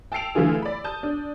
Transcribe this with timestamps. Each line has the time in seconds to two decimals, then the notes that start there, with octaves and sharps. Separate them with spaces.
0.12 G5 A5 E6 C7 D7 F7
0.35 D3 E3 A3 E4 F4 G#4
0.62 D5 B5
0.84 A5 D#6 G6
1.03 D4